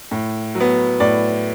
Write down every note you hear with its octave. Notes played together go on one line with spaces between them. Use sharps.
A2
F#3
B3
A2 D5